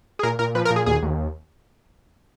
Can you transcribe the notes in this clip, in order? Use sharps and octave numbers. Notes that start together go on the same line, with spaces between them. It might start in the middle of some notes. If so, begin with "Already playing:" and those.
G#4
A#2 A#4
A#2 A#4
F3 B4
A#4
A#2
G#4
D#2 G#4
D#2